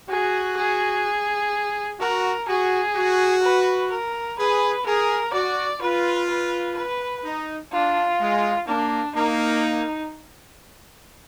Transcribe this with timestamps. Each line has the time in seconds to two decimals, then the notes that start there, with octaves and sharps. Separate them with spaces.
0.09 F#4 G#4
0.57 G#4
1.99 F#4 A#4
2.48 F#4 G#4
2.95 F#4
3.43 B4
3.91 A#4
4.39 G#4 B4
4.86 G#4 A#4
5.33 F#4 D5
5.81 F4 B4
6.29 B4
6.77 B4
7.24 D#4
7.72 D4 F4
8.20 G#3
8.67 A#3 D4
9.15 A#3 D#4